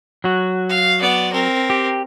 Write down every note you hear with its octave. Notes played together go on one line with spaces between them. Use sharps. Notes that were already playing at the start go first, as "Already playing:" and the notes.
F#3 F#4
F5
B3 D5
C4 A#4
G4